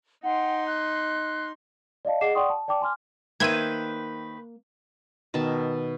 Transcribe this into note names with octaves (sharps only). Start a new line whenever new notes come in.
D#4 F#5 G5 C6
F#6
D5 D#5 F5 A5
G#4 D#5 F#5 D6 C7 E7
D5 F#5 G5 C6 C#6 D#6
A5
D5 G5 A5 D6
G#5 C6 D6 F6
D#3 A#3 B4 C5 E5 G5 G#6 D#7
B2 D#3 E5 A5